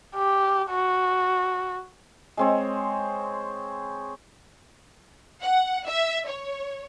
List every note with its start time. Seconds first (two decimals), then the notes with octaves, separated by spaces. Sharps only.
0.15 G4
0.70 F#4
2.37 G#3 C4 C#5
5.42 F#5
5.87 E5
6.28 C#5